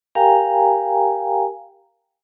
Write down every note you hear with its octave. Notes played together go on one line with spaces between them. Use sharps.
G4 A#4 F5 G5 G#5 A#5